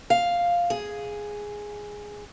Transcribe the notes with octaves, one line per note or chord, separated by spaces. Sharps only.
F5
G#4